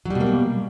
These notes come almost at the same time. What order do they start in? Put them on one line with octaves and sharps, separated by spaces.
F#3 G3 B2 A#3